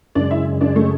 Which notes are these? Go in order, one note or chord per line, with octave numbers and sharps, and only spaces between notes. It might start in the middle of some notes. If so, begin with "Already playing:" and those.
F#2 C#3 G#3 D4 D5
E4 E5
D4 D5
A3 A4